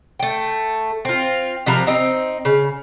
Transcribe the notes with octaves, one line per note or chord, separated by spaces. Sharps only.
A3 G5
C4 F4
C3 F3 A#4 B4
C4 D#4
C#3